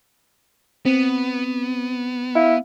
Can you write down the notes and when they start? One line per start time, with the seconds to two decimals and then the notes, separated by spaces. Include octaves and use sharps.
0.85 B3 C4
2.35 E4 F5